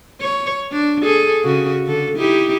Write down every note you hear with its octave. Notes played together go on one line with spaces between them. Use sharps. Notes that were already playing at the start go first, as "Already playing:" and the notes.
C#5
D4
G#4 A4
C#3 F#4
D3 A4
D#4 E4 G4